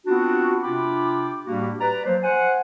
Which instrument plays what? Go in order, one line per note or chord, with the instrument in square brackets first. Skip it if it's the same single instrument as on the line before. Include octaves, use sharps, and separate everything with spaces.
[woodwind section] B3 C4 D4 F4 F#4
C3 D4 F4 G5 B5 D6
A2 G3 A#3 D4 F#4 G4
B4 D5 A#5
F3 F#3 A#3 C5
C5 F#5 G#5